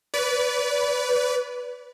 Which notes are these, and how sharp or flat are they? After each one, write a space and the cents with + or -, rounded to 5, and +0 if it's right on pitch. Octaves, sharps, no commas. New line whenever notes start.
B4 +0 D5 -35